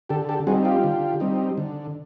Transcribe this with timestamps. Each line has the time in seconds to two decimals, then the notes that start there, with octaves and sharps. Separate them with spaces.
0.09 D3 G4 A4
0.29 G4 A4
0.47 G3 C4 D#4 F#4 G#4
0.65 F4 G4
0.84 D3
1.20 G3 C4 D#4
1.58 D3